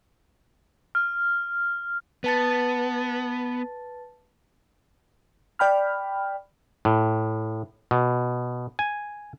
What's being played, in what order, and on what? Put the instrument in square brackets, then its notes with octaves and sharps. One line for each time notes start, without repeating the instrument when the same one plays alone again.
[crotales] F6
[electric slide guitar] B3 [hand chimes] B4 A5 A6
[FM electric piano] D5 G5 B5 F6
[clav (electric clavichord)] A2
B2
G#5